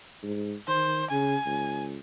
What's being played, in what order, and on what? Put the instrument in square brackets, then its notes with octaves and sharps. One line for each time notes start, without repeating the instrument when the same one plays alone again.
[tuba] G#2
[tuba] D#3 [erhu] C5
[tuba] C#3 [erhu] G#5
[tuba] C#2